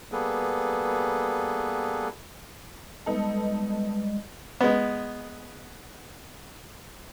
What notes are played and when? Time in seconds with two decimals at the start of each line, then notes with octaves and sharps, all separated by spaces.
0.12 G3 A#3 B3 G#4 A4 B4
3.06 G3 G#3 B3 D#4 A4
4.61 G#3 B3